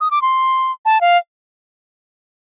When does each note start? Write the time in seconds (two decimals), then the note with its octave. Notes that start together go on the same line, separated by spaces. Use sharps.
0.01 D#6
0.11 D6
0.22 C6
0.85 A5
1.01 F5